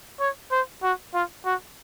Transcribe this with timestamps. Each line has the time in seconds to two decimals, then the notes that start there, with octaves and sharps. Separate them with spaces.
0.20 C#5
0.52 C5
0.83 F#4
1.14 F4
1.45 F#4